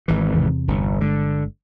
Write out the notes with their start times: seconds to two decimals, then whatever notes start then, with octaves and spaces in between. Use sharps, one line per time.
0.08 G#1 E3
0.33 E2 C3
0.68 G1
1.01 G1 D3 G#3